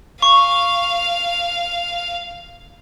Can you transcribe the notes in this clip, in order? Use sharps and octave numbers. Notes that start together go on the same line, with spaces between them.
F5 C#6